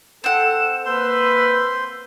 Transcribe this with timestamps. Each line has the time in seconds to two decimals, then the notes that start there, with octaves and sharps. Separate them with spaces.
0.24 C4 A4 F#5 E7
0.86 A#3 B4 C5 C6 E6